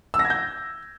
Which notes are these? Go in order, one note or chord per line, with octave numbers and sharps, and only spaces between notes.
E6
A#6
G#6
G6